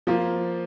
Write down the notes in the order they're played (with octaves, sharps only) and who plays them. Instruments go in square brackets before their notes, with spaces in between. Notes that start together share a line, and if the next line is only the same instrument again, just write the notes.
[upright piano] F3 A#3 F4